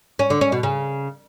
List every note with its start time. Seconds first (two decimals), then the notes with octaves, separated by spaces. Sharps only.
0.19 C#4
0.30 D3
0.41 C#4
0.52 B2
0.63 C#3